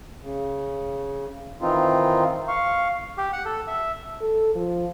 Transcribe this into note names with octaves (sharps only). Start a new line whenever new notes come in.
C#3
D#3 E3 C4 D#4 F4
F5 C#6
G4
F#5
A4
E5
A4
F3